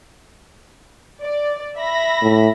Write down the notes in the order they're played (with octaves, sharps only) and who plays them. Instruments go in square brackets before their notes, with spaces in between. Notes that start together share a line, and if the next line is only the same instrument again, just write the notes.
[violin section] D5
E5 B5 A#6
[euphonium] A2